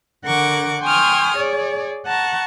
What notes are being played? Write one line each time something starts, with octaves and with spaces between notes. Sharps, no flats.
D3 A#4 F#5 C#6 D6
G5 G#5 C6 C#6 D#6 F6
G#4 C#5 D5
F#5 A5 A#5 C#6